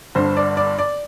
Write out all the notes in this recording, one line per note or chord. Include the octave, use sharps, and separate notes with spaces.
G1 G2 D3 C5
D5
D5
D5